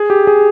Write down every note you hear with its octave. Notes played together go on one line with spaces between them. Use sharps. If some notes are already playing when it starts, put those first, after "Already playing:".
Already playing: G#4
G4
G#4